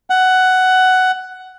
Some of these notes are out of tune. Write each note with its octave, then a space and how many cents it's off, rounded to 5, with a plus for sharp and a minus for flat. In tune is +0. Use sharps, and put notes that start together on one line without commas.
F#5 +10